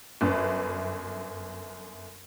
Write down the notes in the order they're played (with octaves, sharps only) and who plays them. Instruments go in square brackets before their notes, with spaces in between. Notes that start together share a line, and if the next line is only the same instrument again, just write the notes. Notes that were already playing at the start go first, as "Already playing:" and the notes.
[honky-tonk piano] G1 F#2 B4